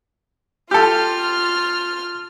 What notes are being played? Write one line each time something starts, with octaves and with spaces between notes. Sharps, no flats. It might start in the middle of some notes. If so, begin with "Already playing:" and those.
F4 G4 A4 F6